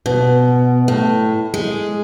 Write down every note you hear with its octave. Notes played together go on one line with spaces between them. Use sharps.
B2
A2
G#3